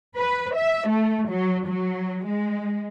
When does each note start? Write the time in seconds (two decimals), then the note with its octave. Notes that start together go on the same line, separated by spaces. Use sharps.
0.16 B4
0.55 E5
0.89 A3
1.30 F#3
1.66 F#3
2.26 G#3